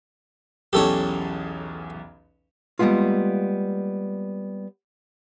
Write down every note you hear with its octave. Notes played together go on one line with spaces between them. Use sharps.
B1 E2 C#4 G4 A4 C#5
G3 G#3 A#3 B3 F4